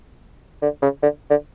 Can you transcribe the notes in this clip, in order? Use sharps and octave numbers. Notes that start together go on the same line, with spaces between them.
D3
C#3
D3
D3